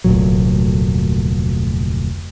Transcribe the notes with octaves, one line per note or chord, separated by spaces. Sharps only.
F1 D2 A#2 F#3